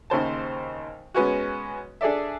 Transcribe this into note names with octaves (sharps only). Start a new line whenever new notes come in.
D#2 C#3 C5 A5
G#3 B3 C#4 F#4
D4 G#4 A4 D5 E5